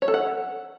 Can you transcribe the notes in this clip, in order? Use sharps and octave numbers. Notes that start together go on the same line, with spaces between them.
C#5
A4
F#5